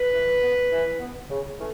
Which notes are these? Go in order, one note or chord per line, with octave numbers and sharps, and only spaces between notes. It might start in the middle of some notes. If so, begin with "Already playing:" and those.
Already playing: B4
E3
B3
E3
B3
C#3
E3 A3 C#4